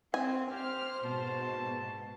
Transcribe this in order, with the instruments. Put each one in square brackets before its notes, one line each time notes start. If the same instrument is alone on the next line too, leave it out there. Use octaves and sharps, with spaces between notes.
[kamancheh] C4 [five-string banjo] G#5
[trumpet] G4 [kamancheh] C5 [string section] F6
[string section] G#2 B2 [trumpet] A5